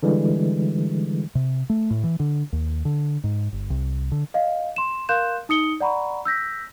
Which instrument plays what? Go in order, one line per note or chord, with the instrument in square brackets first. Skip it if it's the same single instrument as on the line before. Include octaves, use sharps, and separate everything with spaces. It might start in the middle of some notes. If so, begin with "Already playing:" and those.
[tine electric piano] D3 E3 G3 G#3
[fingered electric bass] C3
A3
A2
E3
D3
D#2
D3
G#2
G1
C2
D3
[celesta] D#5 F5
C6 E7
A#4 F5 C6 F#6 G6 E7
D#4 D#6 C#7 G7
D5 F#5 A#5 B5 C#6
E6 G6 A#6 B6